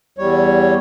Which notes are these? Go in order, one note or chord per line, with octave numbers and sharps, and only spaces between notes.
E2 G3 C#5